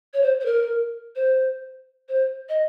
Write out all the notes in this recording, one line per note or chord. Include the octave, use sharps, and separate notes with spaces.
C#5
C5
C5
A#4
C5
C5
D#5